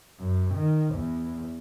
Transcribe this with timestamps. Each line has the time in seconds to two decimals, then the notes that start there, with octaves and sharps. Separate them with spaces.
0.19 F#2
0.54 D#3
0.94 E2